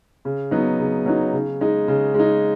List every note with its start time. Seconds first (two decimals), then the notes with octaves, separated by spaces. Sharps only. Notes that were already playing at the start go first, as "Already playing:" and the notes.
0.25 C#3
0.51 F#3 B3 D#4
0.80 C#3
1.06 F#3 B3 D#4
1.33 C#3
1.61 G#3 D#4
1.88 C#3
2.14 G#3
2.19 D#4